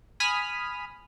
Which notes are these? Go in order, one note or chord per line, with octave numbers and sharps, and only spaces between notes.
G#5 B5 D#6 F6 B6 D#7